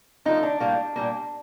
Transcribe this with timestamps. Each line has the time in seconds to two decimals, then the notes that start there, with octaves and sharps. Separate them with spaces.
0.25 D3 F3 A3 D#4
0.43 D4
0.60 A2 G3 A#3
0.96 A#2 G3 A#3